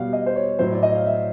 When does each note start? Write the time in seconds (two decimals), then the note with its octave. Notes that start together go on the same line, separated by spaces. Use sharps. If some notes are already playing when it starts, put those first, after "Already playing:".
Already playing: B2 G3 F5 F#5
0.13 D#5
0.26 C5
0.36 C#5
0.59 A2 F#3 C5
0.73 D5
0.83 D#5
0.96 F5
1.06 E5